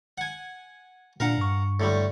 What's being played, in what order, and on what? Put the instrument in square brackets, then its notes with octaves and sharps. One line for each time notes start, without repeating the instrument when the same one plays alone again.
[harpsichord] F#5 G#5
[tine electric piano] A#2 D4 [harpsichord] A#4 F5 F#5
[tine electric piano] G2 C#6
[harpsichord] A2 D3 G3